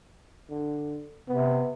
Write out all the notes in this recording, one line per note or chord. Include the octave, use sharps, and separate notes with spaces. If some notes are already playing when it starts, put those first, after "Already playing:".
D3
C3 B3